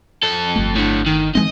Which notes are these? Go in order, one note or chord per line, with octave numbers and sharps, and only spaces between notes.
F2 A4
G1 A3
A2 D3
D#3
E3 G#3 C4 D#5